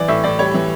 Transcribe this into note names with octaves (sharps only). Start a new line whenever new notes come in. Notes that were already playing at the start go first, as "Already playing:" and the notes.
Already playing: E3 D5
A2 E5
A2 D5
G3 C#5
E3